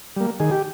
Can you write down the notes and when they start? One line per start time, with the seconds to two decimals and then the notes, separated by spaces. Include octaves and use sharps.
0.16 G3 A#3
0.40 D#3 G#4
0.51 G4